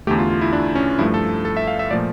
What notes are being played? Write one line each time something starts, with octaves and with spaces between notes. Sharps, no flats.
E2 D3 A3 G4
F4
F4
E4
D4
C#4
G2 F3 A3 E4
A4
A4
E5
F5
E5
A#2 F3 A3 D5